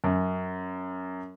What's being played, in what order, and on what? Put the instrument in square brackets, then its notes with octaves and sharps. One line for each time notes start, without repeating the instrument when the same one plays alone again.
[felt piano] F#2